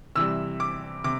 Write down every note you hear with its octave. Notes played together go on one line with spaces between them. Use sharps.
C3 E3 G3 E6
D6
C3 D6